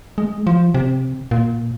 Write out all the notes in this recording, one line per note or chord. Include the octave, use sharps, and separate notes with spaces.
G#3
F3
C3
A#2